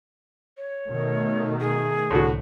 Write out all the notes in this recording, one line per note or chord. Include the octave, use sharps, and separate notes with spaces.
C#5
B2 D#3 A3
G#4
C2 A2 D3 F#4